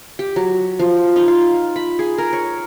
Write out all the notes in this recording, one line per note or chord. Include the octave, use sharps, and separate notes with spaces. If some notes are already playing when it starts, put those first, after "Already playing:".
G4
F#3
F3
D#4
F4
B5
G#4
A#4
C#5